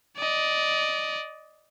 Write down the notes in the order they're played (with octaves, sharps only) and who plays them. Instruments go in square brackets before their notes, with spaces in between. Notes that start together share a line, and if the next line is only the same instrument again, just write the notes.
[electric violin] D5 D#5